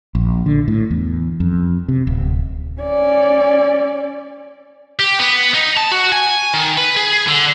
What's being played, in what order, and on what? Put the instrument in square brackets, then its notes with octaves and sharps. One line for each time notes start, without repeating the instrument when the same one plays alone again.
[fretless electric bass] A#1
D3
A2
E2
F2
C3
D1
[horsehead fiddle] C#4 D5
[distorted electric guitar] G4
B3
D#4
A5
F#4
G#5
D#3
B4
G#4
D3